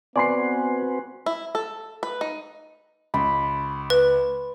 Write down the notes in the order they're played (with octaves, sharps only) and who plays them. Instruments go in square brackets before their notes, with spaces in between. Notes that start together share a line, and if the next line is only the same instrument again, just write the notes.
[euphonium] B3 [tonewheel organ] C4 F#4 B4 [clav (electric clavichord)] D5 [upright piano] G#5 C6 C7
[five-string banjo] E4
A4
B4
D#4
[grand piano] C#2 [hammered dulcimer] B5 C6
[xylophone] B4